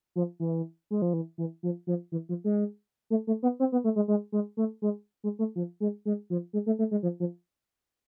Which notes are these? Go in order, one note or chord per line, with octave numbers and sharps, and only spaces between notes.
F3
E3
G#3
F3
E3
E3
F3
F3
E3
F3
G#3
A3
A3
B3
C4
B3
A3
G#3
G#3
G#3
A3
G#3
G#3
A3
F3
G#3
G#3
F3
G#3
A3
A3
G#3
F3
F3